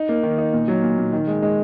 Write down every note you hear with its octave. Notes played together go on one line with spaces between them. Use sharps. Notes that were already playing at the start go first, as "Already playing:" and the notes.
Already playing: D#4
A#3
D#3
D#4
A#2
F#3
A#2
A#2
D#3
G#3
G#3